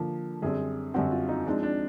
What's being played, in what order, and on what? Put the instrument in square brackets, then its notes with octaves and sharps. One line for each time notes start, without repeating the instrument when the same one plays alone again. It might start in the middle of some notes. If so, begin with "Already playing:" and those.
Already playing: [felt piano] D3 F3 A#3
[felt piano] F#2 D3 G3 C4 [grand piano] G#4
[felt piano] F#2 D3 G3 C4 [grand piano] F#4
[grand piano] F4
D#4
[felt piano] F3 G#3 C4 D#4 [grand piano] D4
[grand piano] D4